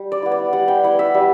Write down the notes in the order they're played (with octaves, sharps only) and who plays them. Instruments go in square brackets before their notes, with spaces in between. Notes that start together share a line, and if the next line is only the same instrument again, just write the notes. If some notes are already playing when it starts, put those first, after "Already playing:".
Already playing: [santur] G3
D5
B3 E4
D5
G3 F#5
G5
B3 E4 F#5
E5
G3